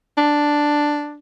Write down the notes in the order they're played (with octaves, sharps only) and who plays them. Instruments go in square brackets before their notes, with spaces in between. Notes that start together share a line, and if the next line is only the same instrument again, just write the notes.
[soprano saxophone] D4